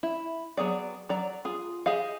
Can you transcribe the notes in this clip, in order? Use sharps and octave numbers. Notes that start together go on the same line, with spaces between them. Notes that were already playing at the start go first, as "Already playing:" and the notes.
E4
F#3 B3 G#4 D5
F#3 D5 A#5
F4 G#4
G4 G#4 D#5 F5